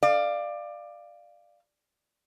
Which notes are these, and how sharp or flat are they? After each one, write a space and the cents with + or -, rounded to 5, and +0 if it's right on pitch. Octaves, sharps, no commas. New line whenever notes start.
D5 +20 F5 -10